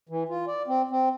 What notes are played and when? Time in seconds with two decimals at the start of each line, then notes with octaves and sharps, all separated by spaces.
0.09 E3
0.29 F4
0.47 D5
0.67 C4
0.91 C4